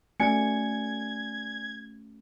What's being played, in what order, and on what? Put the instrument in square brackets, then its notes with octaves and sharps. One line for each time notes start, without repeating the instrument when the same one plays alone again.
[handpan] A3 C#4 F#4 [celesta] D5 G#5 C#7 [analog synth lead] G#6